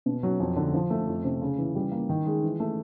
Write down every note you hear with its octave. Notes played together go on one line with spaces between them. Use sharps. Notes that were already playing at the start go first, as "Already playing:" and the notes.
B2
F#3
F2
D3
F3
A3
F2
C3
C#3
E3
G3
A#3
D#3
G#3
E3
A3